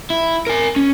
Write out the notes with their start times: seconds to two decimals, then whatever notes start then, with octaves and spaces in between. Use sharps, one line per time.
0.10 E4
0.47 A#4 G#5
0.76 C#4